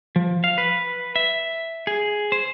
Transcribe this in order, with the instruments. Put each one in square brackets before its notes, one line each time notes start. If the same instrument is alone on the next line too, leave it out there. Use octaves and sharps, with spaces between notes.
[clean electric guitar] F3
F5
B4
E5
G#4
C5